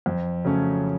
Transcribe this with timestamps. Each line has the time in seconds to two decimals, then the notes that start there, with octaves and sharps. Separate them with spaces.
0.06 F2
0.45 C#3 F#3 A3 C#4